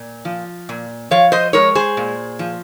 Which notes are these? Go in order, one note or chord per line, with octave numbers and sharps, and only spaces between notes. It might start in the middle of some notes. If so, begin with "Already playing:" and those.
Already playing: A#2
F3
A#2
F3 C#5 F5
C5 D#5
G#3 A#4 C#5
G#4 C5
A#2
F3